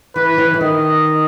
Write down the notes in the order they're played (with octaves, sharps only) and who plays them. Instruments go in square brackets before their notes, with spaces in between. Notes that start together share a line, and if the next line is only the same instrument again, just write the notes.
[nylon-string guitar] E3 [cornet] B4
[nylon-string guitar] E3
E3
[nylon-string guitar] D#3 [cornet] D#5